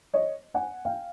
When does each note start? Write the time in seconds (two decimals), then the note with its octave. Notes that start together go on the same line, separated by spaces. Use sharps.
0.14 C#5 D#5
0.54 F#5 G#5
0.85 F5 G5